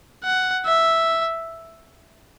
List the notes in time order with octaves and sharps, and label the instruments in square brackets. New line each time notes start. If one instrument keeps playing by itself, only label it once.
[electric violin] F#5
E5